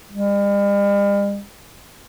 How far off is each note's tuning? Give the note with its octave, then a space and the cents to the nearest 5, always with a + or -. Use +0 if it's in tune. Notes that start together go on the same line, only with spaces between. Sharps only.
G3 +45